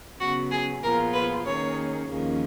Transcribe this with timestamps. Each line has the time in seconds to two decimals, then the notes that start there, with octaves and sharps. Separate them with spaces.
0.20 C#3 F#3 B3 F#4
0.51 G#4
0.82 A#2 F3 B3 F4 G#4 A#4
1.14 B4
1.45 D#3 A#3 C#4 G#4 C#5
2.08 D#2 C#3 F3 A#3 C#4